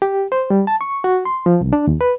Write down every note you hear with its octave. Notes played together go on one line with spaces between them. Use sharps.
G4
C5
G3
A5
C#6
F#4
C6
F3
C2
D4
D#2
B4